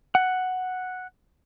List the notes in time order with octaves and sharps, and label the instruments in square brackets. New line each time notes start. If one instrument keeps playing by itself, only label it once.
[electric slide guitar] F#5